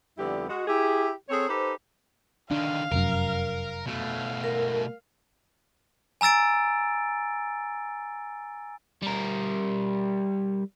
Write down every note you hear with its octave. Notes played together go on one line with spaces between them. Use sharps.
F2 D3 G3 B3 E4 G4
G#3 F#4
E4 G4 G#4
C4 G#4 A4 C#5
D#4 G4 A4 B4 C5
D3 D#3 D4 F5
F1 F#2 A#4
B2 A3 F5
A#4
G#5 A#5 E6 A6 D7
G3 A#4